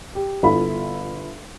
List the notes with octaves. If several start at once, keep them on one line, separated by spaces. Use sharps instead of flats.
G4
G1 E4 F4 A4 E5 B5